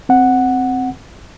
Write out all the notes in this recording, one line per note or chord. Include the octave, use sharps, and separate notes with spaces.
C4 F#5